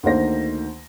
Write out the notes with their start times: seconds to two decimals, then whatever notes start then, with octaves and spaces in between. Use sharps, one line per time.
0.03 D2 D#3 A#3 C5 A#6